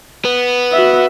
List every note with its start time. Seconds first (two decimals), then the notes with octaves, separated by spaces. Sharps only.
0.25 B3
0.73 F#4 E5